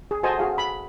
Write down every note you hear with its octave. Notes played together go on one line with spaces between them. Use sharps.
G#4
F#4 A4 C5 D#5 G#5 A5
F#4 G#4 F5
B5